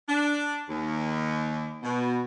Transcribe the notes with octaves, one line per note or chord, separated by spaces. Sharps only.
D4
D#2
B2